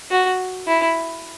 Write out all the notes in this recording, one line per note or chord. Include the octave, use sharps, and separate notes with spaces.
F#4
E4